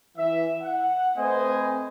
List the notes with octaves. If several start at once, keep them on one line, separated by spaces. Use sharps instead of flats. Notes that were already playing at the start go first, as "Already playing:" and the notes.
E3 E5
F#5
A3 C4 B4 C5 D#5 G#5